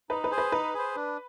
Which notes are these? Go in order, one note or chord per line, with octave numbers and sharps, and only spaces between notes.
D#4 B4
B4
G#4 C5
B4
D#4 B4
G#4 C5
D4